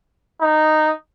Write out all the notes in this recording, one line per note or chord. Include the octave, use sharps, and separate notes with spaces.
D#4